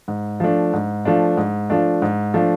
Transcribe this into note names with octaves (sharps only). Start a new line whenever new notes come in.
G#2
F3 A3 D4
G#2
F3 A3 D4
G#2
F3 A3 D4
G#2
F3 A3 D4